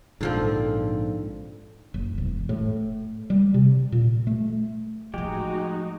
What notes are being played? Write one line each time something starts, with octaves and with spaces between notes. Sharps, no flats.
A#1 G#2 D3 F3 C4
F#1
E1
A2
G3
C3
A#2
A3
A2 F3 G#3 D#4 F#4 G4